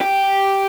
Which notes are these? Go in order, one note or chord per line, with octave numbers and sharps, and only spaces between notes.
G4